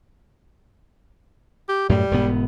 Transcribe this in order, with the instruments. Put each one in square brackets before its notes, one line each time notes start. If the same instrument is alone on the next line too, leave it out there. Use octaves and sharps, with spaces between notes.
[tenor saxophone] G4
[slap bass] F#2 A2 [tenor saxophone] G3
[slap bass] E1 G#2 B3